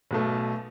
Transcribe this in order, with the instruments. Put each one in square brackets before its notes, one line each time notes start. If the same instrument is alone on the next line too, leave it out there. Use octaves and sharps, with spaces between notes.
[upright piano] B1 B2 A3